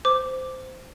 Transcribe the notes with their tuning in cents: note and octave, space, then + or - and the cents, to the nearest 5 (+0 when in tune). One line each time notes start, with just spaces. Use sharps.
C5 -15 D6 +0